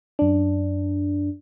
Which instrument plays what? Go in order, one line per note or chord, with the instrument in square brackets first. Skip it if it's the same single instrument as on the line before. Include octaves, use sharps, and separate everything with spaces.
[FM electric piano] F#2 D4